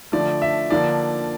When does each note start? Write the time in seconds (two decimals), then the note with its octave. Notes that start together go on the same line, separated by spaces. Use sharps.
0.12 D3 F3 A3 D5
0.42 E5
0.71 D3 F3 A#3 D4 D5